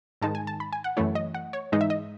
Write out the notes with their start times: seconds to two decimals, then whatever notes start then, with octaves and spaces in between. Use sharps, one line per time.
0.22 G#2 D#3 G#3 D#4 A5
0.35 G#5
0.47 A5
0.60 B5
0.73 G#5
0.84 F#5
0.97 F#2 E3 A3 E4 C#5
1.15 D#5
1.34 F#5
1.53 C#5
1.72 G#2 E3 G#3 D#4 D#5
1.81 E5
1.90 D#5